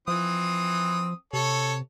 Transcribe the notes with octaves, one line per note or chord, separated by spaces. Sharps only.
E3 F3 C4 D#6
C3 A4 C#5